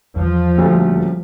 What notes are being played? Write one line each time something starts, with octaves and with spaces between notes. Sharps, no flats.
E2 F3
D#1 D2 A3 A#3 C#4 A4